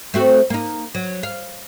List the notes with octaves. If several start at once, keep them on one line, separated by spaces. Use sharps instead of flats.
A3 C4 F#4
A#3 D#4
F#3
F5